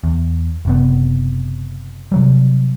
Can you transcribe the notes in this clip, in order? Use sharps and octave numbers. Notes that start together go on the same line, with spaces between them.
E2
F#1 C3 B3
C3 F#3 G3